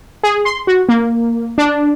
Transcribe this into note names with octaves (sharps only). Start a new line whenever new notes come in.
G#4
C6
F#4
A#3
D4